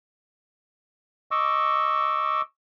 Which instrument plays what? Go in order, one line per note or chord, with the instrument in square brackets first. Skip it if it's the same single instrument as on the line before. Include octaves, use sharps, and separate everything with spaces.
[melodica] D#5 C#6 D6 E6